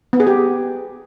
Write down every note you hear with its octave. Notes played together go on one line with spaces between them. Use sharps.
B3
G#4
G4